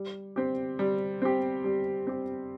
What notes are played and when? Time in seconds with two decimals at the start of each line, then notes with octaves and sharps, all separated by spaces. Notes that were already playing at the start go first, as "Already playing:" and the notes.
Already playing: G3
0.36 C4 G4
0.79 G3
1.22 C4 G4
1.64 G3
2.07 C4 G4